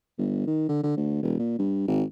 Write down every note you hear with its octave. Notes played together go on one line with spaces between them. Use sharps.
G1
D#3
D3
D3
D2
E1
A#2
G2
G#1